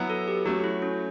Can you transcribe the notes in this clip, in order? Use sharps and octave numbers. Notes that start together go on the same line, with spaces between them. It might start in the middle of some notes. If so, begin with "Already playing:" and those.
Already playing: F#3 B3 E4
A4
G4
F#3 A3 C#4 F#4
E4
C#4